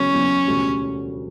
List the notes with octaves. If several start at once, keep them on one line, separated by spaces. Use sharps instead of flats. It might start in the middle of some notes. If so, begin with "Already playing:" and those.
Already playing: F#1 E2 C#3 F#3 C#4
F#1 E2 C#3 F#3
E1 D2 C#3 G3